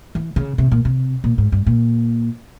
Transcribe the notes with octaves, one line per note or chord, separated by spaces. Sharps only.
E3
C#3
C3
A#2
C3
A#2
G#2
G2
A#2